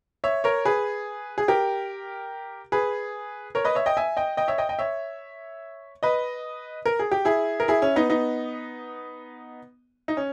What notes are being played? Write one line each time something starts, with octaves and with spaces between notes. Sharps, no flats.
C#5 E5
A#4 C#5
G#4 B4
G#4
G4 A#4
G#4 B4
A#4 C#5
B4 D#5
C#5 E5
D#5 G5
E5 G#5
D#5 G5
D#5 G5
C#5 E5
D#5 G5
D#5 G5
C#5 E5
B4 D#5
A#4
G#4
G4
E4 G#4
A#4
E4 G#4
C#4 E4
B3 D#4
B3 D#4
D#4
C#4